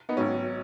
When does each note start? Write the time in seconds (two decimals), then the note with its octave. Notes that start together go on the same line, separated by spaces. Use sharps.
0.09 B3 D#4
0.17 G#1 G#2 F#3 C#4